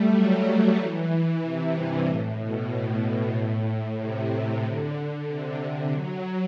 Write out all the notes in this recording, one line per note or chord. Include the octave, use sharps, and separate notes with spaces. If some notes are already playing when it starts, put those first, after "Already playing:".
Already playing: G3 A3
F#3
E3
C3
G2
A2
B2
A2
A2
C3
D3
D3
C3
D3
F#3